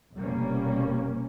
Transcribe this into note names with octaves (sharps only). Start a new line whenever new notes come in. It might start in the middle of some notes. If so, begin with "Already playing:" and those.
F1 F2 B2 G3 A#3 C#4